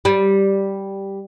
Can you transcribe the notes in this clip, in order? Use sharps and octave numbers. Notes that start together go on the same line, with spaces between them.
G3